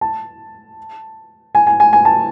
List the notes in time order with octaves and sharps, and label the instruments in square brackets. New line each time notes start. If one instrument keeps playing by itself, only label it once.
[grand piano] A5
G#5
G#5
G#5
G#5
A5